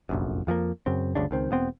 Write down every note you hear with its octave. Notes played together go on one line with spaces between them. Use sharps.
F1 A#1 F#2
F2 F3 A3 A#3
F#2 C#3 C4
G1 D2 C#3 D4
C#2 D#3 C4
E1 B3 C4